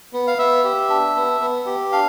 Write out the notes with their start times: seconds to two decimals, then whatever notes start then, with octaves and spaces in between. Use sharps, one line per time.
0.13 B3
0.27 F5
0.38 B3 E5
0.64 G4
0.89 D4
1.16 B3
1.41 B3
1.66 G4
1.92 D4 F5